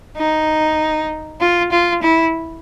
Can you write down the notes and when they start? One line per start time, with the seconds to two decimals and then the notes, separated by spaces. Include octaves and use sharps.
0.17 D#4
1.41 F4
1.71 F4
2.02 E4